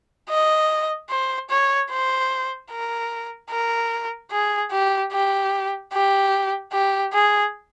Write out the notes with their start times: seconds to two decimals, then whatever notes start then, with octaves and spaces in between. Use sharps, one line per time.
0.29 D#5
1.10 C5
1.50 C#5
1.91 C5
2.71 A#4
3.51 A#4
4.31 G#4
4.72 G4
5.12 G4
5.93 G4
6.73 G4
7.13 G#4